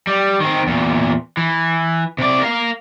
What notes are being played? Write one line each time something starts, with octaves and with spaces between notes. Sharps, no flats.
G3
D#3 C4
E2 A#2
E3
C3 D5
A#4 F5